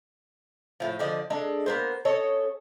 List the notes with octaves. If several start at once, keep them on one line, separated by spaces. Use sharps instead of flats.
A2 F3
D3 F3 D5 D#5
G#3 D4 A4
A#3 B3 C5
C#4 A4 C#5 D#5